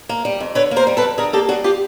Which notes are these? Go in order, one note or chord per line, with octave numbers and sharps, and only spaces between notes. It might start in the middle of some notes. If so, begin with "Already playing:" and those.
A#3
G3
F2
D3 B4 C#5
A#3
A#4 C5
G3
A4 B4
F2
D3 G#4 A#4
A#3 G4 A4
G3 F#4 G#4
F4 G4